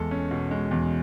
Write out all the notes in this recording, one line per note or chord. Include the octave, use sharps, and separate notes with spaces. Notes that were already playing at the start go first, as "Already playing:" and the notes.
Already playing: E2 G#3 A4
C#4
B2
G#3
E2